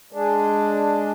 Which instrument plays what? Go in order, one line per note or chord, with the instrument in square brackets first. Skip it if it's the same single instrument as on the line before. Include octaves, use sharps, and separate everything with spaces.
[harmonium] G#3 D4